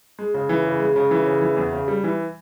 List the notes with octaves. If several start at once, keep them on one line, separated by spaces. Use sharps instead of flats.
G#3
C#3
E3
C#3
G#3
C#3
E3
C#3
E3
E2
C#3
G3
E3